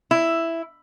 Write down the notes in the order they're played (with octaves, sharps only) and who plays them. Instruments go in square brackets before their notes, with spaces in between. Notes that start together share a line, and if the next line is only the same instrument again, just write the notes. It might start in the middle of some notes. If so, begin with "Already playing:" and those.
[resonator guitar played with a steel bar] E4